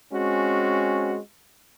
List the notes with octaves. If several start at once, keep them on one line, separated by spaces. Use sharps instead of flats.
G#3 C4 C#4 F#4